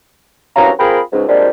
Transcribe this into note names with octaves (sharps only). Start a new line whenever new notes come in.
C2 G2 F#3 C#4 F5 A#5
C4 F4 G#4 A#4 G5 B5
C#2 G#2
F2 A#2 F3 G3 G#3 D4